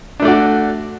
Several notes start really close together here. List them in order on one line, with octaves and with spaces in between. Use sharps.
D4 A3 D5 F#4